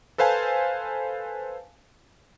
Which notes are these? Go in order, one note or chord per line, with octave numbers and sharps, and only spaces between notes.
A4 B4 C5 F5 G#5 A5